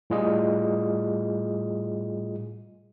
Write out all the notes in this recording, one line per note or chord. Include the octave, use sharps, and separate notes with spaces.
A2 G3 F4 G#4 D#5